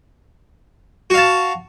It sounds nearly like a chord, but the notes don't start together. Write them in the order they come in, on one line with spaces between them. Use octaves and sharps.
F#4 F5 A5